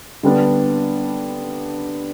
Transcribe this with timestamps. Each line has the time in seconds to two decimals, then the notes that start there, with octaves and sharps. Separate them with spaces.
0.23 D3 G3 B3 D4